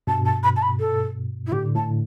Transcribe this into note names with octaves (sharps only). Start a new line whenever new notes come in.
G2 B2 A5
A5
B5
A5
B5
A4
E4
A2 D3 G4
A2 A5